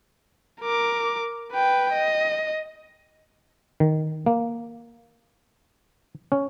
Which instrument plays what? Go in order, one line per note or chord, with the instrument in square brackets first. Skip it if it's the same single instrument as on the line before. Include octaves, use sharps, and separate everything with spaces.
[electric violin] A#4 D6
B4 G5
D#5
[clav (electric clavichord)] D#3
A#3
C#4